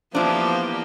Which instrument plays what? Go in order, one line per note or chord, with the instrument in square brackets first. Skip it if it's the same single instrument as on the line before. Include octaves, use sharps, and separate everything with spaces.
[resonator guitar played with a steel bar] E3 D4 [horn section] F3 [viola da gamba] A#3 B3 G4